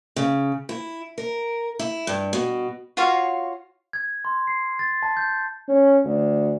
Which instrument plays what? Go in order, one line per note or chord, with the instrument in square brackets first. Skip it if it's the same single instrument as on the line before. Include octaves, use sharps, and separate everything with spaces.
[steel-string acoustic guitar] C#3
E4
A#4
E4
G2
B2
[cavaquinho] F4 F#4 C#5 F5
[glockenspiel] G#6
C6
C7
A6
A5
G6
[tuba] C#4
D2